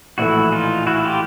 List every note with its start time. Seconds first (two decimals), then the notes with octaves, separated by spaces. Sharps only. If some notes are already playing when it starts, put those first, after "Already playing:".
0.18 A#1 A2 E3 A3 E4 F#4
0.52 D#4 F4
0.87 E4 F#4
1.04 F4 G4